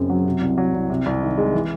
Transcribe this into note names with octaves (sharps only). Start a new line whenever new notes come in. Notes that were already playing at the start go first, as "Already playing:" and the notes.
Already playing: F#1 F#2 C#3 C4
F#3
C3
C2
F#3
C2
C3
C2
D#3
G#3
E3